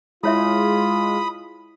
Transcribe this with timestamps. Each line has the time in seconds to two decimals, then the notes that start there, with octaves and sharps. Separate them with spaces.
0.24 G#3 E4 F4 C#5 E5 B5 D#6